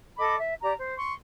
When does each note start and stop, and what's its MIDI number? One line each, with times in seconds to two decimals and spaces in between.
0.19 0.35 69
0.19 0.35 75
0.19 0.35 83
0.19 0.35 86
0.39 0.53 76
0.62 0.73 67
0.62 0.73 74
0.62 0.73 82
0.79 0.94 72
0.97 1.13 84
0.97 1.13 85